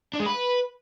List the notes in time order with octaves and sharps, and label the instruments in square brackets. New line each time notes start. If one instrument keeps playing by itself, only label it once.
[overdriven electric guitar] D4
G#3
B4